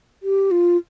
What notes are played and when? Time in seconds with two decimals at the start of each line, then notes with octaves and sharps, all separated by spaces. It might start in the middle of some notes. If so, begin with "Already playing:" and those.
0.23 G4
0.51 F4